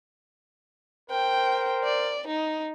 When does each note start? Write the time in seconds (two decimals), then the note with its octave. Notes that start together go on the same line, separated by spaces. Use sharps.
1.10 A#4 C5 G5
1.84 D5
2.27 D#4